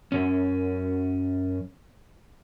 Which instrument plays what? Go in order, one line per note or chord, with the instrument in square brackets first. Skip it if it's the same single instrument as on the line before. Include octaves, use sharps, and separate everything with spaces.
[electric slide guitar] F#2 C#4